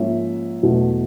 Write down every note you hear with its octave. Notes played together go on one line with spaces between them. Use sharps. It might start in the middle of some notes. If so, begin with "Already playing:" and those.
Already playing: G#2 F3 A#3 C#4 E5
E2 B2 F#3 A3